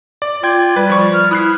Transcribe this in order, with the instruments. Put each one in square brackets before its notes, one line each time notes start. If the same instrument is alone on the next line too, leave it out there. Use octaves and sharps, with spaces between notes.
[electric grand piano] D5
[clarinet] F4 [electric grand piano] D5 G5 G#6
[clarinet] G3 [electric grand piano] B4
[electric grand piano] F3 C#6
[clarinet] F6
[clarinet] E4 [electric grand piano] D#6 F#6 C7